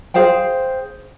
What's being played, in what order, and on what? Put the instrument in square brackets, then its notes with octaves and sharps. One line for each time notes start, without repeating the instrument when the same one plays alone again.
[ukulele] G#4 C5 F5 G5